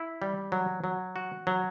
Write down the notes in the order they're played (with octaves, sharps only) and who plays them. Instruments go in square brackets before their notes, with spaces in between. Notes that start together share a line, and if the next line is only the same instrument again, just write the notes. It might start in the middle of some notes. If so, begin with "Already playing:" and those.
Already playing: [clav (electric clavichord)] E4
G3
F#3
F#3
F#4
F#3